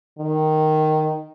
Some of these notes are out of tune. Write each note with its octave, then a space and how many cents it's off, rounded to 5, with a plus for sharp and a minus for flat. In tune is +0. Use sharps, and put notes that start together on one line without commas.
D#3 -5